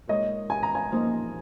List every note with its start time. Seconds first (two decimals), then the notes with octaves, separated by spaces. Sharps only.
0.07 A#2 G#3 D#4 A#4 C#5 D#5
0.50 G#5
0.63 A#5
0.75 G#5
0.91 F3 A#3 D#4 A#4 D#5